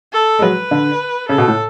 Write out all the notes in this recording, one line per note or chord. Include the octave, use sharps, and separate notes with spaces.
A4
G#3
F#3 B4
D3
C#3 A4
B2
A2